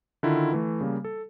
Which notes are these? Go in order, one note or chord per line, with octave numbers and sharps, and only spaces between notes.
D3 D#3 E4 F4
E3 A3
C#3 G3 A#3
A4